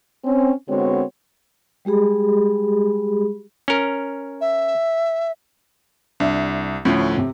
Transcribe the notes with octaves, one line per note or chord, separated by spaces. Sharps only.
C4 C#4
D3 G#3 B3 C4 F#4 C#5
G3 G#3 G4 G#4 B5
C#4 A#4
E5
C2 D4 E5
D2 A2 F3 C#4
C3